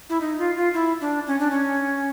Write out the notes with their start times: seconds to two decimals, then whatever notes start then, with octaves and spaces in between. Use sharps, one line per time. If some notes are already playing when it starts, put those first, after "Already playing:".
0.10 E4
0.20 D#4
0.38 F4
0.56 F4
0.74 E4
1.01 D4
1.27 C#4
1.39 D4
1.50 C#4